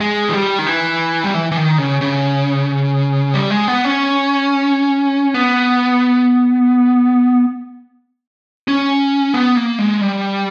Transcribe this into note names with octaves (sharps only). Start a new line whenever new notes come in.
G#3
E3
G3
D#3
E3
G3
E3
E3
D#3
C#3
C#3
G3
G#3
B3
C#4
B3
C#4
B3
A#3
G#3
G3